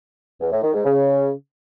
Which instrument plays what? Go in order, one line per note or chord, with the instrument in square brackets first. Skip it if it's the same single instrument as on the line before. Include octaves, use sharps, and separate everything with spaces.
[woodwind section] E2
A2
D#3
G#2
C#3